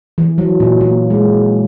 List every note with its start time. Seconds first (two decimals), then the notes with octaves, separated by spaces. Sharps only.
0.18 E3
0.38 F#3
0.60 A#2
0.81 A#3
1.10 G#3